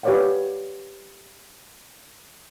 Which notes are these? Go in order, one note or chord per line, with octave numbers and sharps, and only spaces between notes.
G4 B4 C#5 D5 F5 F#5